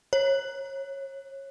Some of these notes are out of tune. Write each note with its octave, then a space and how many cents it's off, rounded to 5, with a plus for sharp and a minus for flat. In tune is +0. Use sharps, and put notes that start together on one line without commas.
C#5 -30